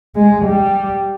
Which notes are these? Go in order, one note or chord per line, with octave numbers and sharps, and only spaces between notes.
G#3
G3